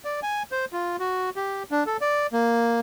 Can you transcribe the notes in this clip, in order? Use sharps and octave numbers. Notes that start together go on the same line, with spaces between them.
D5
G#5
C5
F4
F#4
G4
D4
A4
D5
A#3